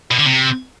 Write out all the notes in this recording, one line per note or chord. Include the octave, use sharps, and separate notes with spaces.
B2
D3
C3